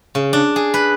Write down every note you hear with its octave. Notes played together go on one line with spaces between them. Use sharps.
C#3
D4
G#4
B4